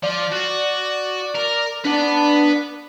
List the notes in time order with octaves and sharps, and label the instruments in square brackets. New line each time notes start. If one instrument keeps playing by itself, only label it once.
[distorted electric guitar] F3 [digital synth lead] D5
[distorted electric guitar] F#4
A#4
[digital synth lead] D4 [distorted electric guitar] B4 F#5